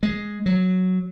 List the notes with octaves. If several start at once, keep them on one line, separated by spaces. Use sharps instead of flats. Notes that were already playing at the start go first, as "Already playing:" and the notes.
G#3
F#3